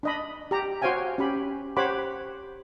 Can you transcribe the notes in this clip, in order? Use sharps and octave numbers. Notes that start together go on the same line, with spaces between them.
D4 D#5 B5
G4 A#5
F#4 C5 C#5 F5 G5 G#5
C#4 G4 B5
G4 C5 C#5 F#5 B5 D6